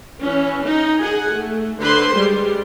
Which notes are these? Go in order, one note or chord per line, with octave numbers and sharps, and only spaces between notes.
E3 C#4
D#4
G#4 F#5 G#5
A3
D3 B4 C5 C6
G3 G#3